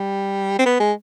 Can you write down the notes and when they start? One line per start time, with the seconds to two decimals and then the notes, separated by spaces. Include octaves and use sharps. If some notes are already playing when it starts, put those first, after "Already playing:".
Already playing: G3
0.59 C4
0.66 B3
0.80 G#3